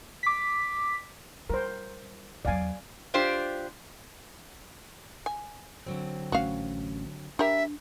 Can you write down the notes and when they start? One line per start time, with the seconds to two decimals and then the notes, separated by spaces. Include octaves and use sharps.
0.23 D6 B6
1.50 G3 A#4 C5
2.45 E2 F#3 D5 F5 G#5
3.14 D4 F4 G4 C5
5.26 G#5
5.86 D3 F#3 C4
6.32 A1 A3 C#4 F#4 F5
7.39 G3 D4 A#4 E5